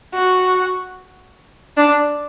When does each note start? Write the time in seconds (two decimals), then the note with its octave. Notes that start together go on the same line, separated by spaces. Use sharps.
0.14 F#4
1.77 D4